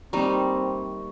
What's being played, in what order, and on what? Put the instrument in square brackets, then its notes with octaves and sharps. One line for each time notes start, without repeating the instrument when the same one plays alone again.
[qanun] G3 D#4 [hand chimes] A#3 C#6 [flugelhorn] C4